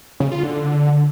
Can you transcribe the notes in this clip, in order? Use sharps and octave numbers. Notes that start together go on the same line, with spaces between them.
C#3
F4
D3